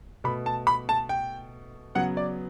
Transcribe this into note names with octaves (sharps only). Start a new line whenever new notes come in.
B2 A3 B5
A5
B5
A5
G5
C#3 F#3 B3 F#5
D5